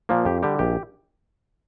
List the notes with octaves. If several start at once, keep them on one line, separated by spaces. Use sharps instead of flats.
A#2 F3 A#3
F2 G4
D3 G3 G4
A#1 G4